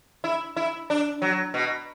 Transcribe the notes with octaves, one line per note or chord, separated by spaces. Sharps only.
E4
E4
D4
F#3
B2